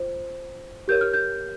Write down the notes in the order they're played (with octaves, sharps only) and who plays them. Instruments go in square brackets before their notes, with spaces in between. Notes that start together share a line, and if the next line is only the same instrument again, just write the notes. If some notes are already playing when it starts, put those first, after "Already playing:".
Already playing: [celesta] F4 C5
G4 A#4 C#5 G6
F6
G6